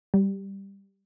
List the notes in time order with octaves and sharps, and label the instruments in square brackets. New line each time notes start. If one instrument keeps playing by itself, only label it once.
[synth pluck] G3